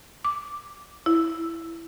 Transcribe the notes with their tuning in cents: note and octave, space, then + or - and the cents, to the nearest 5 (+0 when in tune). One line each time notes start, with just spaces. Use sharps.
D6 +0
E4 +5